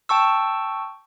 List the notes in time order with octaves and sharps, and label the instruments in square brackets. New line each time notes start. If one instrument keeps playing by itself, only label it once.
[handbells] G5 A5 C#6 E6